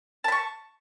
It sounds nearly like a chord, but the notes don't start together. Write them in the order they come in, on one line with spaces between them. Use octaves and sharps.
A5 B5 C#6